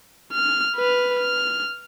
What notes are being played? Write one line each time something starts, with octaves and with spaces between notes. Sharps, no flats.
F6
B4 F6
F6